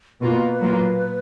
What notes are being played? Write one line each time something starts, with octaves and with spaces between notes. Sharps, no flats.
B2 A#3 F4 B4
A#2 F#3 A#3 F4